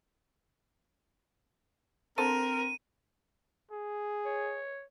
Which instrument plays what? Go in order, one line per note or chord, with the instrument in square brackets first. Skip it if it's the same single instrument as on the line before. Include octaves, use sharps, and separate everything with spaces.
[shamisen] D3 A4 C5 [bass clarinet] C4 [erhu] A#4 [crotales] D#7
[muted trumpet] G#4
[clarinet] C#5